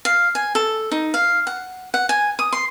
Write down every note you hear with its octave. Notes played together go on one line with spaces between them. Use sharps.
F5
G#5
A4
D#4
F5
F#5
F#5
G#5
D#6
C6